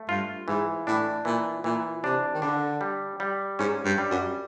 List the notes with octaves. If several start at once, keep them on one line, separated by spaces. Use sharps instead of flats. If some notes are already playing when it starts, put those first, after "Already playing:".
Already playing: A3
G2 F4
G#2 E3
A2 D4
A#2 E3
A#2 E3
C3 D4
D#3
D3 D4
G3
G3
G#2 C#4
G2
G3
F#2